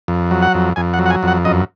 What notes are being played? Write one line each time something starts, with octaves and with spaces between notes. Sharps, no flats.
F2
F#3
F#5
F2
F2 G#5
F#5
F#3
F#5
G#5
F2 F#5
F#2 D#5